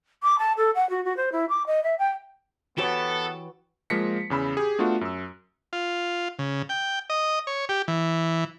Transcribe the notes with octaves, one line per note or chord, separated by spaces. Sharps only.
D6
A5
A4
F#5
F#4
F#4
C5
E4
D6
D#5
E5
G5
E3 B3 F#4 G4 A4 B4 C#5
F3 G#3 A#3 A#6 B6 C#7
E2 C#3 B5 E6
G4 G#4
A3 B3 D4 F4 F#4
F#2 E6
F4
C#3
G5
D#5
C#5
G4
E3